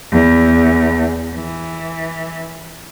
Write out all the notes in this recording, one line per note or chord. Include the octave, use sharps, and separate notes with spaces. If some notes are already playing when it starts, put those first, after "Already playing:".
E2
E3